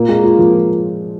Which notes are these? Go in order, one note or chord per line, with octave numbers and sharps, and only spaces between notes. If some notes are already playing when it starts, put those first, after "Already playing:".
Already playing: A#2 A#3
G#3
F4
F3